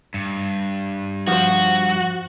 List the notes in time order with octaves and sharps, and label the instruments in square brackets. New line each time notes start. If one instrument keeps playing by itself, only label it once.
[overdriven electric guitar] G2
[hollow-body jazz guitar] F3 C5 [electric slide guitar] F#4